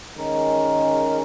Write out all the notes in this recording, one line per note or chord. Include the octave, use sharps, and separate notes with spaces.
D#3 G#3 C#4 A#4